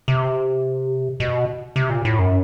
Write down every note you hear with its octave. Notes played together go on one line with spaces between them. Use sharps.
C3
B2
C3
A#2
A2
F#2